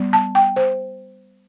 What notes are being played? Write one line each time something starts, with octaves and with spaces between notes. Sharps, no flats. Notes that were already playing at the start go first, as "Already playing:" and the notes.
Already playing: G3 B3
A5
G5
C5